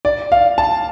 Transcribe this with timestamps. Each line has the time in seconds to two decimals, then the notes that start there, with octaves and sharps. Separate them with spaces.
0.05 D5
0.32 F5
0.58 A5